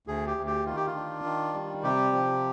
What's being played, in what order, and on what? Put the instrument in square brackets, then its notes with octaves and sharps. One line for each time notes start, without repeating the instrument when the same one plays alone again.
[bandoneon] D2 G#4
G4
D2
G4
D#3 F4
G4
F4
D4
D#3
G3
C3 G4
F3